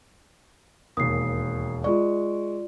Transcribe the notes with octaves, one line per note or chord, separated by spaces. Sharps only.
E1 D#2 D#6 C7
G#3 F4 D5 C#6